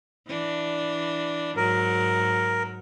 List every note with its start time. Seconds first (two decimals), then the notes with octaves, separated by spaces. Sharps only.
0.27 E3 D4
1.57 G#2 F#3 A#4